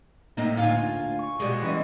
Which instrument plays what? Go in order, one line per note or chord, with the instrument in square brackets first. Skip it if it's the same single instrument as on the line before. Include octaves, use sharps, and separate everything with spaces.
[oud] A2 C4 D#4 [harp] A#3
[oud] D2 F4 [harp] F5 G#5
[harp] C#6
[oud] B2 G3 G#3
[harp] E3 C#4 D#5